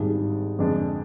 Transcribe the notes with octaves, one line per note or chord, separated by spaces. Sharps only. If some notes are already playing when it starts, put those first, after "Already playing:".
Already playing: G#1 G#2 G3 D4 G#4
F2 D3 G#3 D4